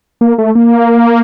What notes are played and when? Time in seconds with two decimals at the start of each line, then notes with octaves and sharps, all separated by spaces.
0.21 A#3
0.38 A3
0.55 A#3